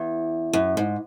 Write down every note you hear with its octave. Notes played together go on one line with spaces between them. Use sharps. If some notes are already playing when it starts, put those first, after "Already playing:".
Already playing: E2
F#2
G#2